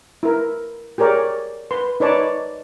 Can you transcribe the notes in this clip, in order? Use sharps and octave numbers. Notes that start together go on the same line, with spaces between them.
E4 A#4
G4 G#4 A#4 C#5 D5
B4 C6
D#4 B4 C#5 D5 A5